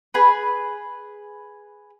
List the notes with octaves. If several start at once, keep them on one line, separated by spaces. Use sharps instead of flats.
G#4 B4